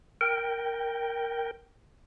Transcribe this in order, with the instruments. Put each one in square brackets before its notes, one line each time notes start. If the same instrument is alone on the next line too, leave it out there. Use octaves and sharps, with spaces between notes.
[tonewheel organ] A#4 G5